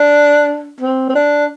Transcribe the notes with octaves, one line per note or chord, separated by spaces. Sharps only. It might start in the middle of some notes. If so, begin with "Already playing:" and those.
Already playing: D4
C4
C4
D4